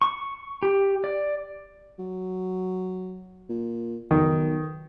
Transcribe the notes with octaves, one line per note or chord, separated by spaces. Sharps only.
C#6
G4
D5
F#3
A#2
B1 D#3